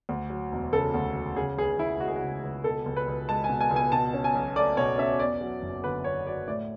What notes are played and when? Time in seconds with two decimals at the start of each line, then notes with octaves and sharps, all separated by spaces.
0.09 D2
0.30 F#3
0.52 E1
0.73 C#3 A4
0.94 D2
1.15 F#3
1.36 C#3 G#4
1.58 C#2 G#4
1.79 C#2 E4
2.00 G#3 F#4
2.08 G#4
2.16 F#4
2.22 C#3
2.43 C#2
2.64 B2 A4
2.86 C#2
2.96 B4
3.07 C#2
3.29 G#3 A5
3.44 G#5
3.49 B2
3.61 G#5
3.70 C#2
3.76 G#5
3.92 B2 A5
4.13 C#4
4.24 G#5
4.34 B1
4.56 A3 D5
4.77 B2 C#5
4.98 C#4 E5
5.19 E2 D5
5.41 F#3
5.62 F#1
5.84 D3 B4
6.04 E2 C#5
6.26 F#3 D5
6.47 A2 D5